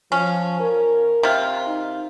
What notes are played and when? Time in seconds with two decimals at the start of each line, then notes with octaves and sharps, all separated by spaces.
0.12 F3 C#4
0.60 A#4
1.23 C3 F4
1.67 D#4